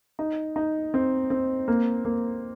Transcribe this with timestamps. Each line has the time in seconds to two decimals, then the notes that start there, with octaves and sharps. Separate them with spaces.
0.19 D#4
0.56 D#4
0.94 C4
1.30 C4
1.68 A#3
2.05 A#3